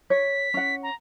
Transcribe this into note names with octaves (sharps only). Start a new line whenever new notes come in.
C#5 B6
C#4 F#5
A#5